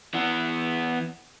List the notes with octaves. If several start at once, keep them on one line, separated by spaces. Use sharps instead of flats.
E3 B3